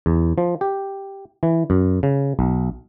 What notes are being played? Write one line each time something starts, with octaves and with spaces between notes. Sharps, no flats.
E2
F3
G4
E3
F#2
C#3
B1